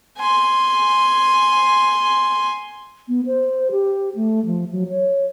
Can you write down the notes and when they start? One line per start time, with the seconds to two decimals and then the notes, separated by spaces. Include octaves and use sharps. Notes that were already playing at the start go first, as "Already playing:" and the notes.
0.18 G#5 C6
3.08 B3
3.26 C5
3.71 G4
4.16 A3
4.46 F3
4.72 F#3
4.89 C#5